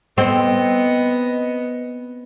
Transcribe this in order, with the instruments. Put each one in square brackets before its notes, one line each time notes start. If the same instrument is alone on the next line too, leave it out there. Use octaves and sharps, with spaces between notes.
[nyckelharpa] B3 [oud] C4 [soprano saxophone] D#5